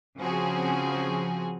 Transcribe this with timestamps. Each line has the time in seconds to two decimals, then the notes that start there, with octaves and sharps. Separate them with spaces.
0.18 C#3 F3 C4 F#4 G#4